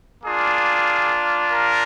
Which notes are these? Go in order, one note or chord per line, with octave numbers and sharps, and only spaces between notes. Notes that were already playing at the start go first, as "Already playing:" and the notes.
A#3 D4 F4 G#4
A#3 A#4